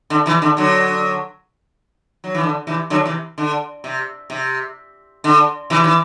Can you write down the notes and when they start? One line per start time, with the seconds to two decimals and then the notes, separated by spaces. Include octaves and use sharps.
0.10 D3
0.26 C3 E3
0.42 D3
0.57 D3 F#3
2.24 F#3
2.35 E3
2.43 D3
2.67 C3 E3
2.90 D3 F#3
3.05 C3 E3
3.38 D3
3.84 C3
4.30 C3
5.24 D3
5.70 C3 E3
5.84 E3